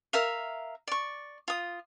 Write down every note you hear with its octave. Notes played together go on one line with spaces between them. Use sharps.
A#4 E5 F5
D5 C#6
F4 D#6